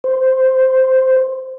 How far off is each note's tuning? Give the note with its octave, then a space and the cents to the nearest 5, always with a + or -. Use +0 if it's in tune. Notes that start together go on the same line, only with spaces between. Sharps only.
C5 -5